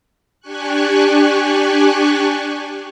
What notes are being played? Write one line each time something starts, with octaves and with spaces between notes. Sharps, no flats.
D4 G4 G#5 C#6 F#6